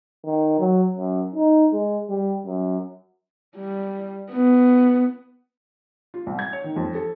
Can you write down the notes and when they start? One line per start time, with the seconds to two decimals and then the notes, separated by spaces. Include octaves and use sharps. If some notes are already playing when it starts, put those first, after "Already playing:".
0.25 D#3
0.59 F#3
0.96 F#2
1.35 D#4
1.72 G#3
2.10 G3
2.46 F#2
3.56 G3
4.32 B3
6.14 F4
6.26 C2
6.39 G#6
6.53 C#5
6.64 D#3
6.76 F2
6.95 A4